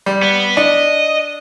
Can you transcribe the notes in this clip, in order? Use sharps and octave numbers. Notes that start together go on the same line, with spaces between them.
G3
B3
D4 D#5